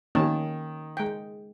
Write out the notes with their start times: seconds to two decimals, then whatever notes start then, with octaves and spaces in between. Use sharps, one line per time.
0.15 D#3 A#3 C#4 A5
0.97 G#3 G5